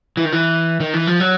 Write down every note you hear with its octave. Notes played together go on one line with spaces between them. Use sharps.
E3
D#3
E3
D#3
E3
F3
F#3